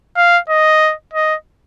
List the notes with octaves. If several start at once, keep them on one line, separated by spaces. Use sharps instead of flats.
F5
D#5
D#5